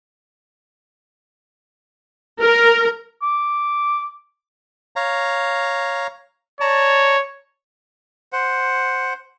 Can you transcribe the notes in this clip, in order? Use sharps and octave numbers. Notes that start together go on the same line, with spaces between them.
A#4
D6
C#5 F5 A#5
C#5 D5 A5 A#5
C5 F#5